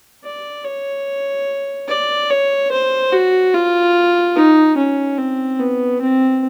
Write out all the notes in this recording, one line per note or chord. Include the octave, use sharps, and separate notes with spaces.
D5
C#5
D5
C#5
C5
F#4
F4
D#4
C#4
C4
B3
C4